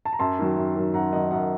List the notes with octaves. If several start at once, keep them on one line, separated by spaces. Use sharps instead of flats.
A5
A#5
F#2 A5 C6
D#3 F#3
F#2
D#3 F#3
F#2 F#5 A#5
D#3 F#3 D#5 F#5
F#2 D#5 F#5